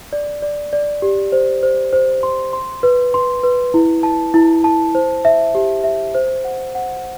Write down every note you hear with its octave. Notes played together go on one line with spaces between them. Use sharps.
D5
D5
D5
G4
C5
C5
C5
C6
C6
B4
C6
B4
E4
A5
E4
A5
C5
E5
G4
E5
C5
F#5
F#5